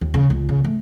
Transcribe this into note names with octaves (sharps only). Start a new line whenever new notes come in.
D#2
C#3
C#2
C#3
A3